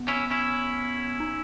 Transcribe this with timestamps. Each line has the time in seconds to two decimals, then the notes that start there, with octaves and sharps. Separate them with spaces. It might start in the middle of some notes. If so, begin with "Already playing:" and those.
Already playing: B3
0.08 C#4 E4
0.31 C#4 E4
1.20 D#4